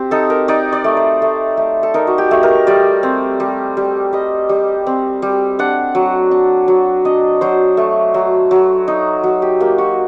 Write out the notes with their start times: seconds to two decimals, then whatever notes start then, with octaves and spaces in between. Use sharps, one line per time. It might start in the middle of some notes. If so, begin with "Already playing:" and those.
Already playing: C4 G4
0.11 D#4 A4
0.30 A#4
0.48 D#4 D5
0.73 D5
0.84 A3
0.97 C5
1.22 A3
1.57 A3
1.83 A4
1.94 D#4 A#4
2.07 F#4
2.18 G4
2.31 A3
2.43 A#4
2.67 G3 D5
3.03 C4
3.40 G3
3.77 G3
4.13 G3 D#5
4.49 G3
4.87 C4
5.22 G3
5.59 D4 F#5
5.95 F#3
6.31 D4
6.68 F#3
7.05 D4 D#5
7.41 F#3 C5
7.77 A3
8.14 F#3
8.51 F#3
8.88 D#4
9.24 F#3
9.42 G4
9.60 A#3 G4
9.78 F#4